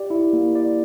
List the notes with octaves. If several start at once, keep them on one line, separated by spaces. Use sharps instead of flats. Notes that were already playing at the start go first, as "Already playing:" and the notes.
Already playing: G4 D5
E4
A#3
D5